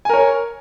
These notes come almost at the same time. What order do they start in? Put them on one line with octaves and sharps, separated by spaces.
G#5 A#4 C#5